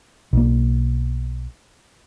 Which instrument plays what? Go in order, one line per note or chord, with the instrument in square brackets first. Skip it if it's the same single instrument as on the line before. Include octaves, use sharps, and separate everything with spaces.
[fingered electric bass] B1 A#3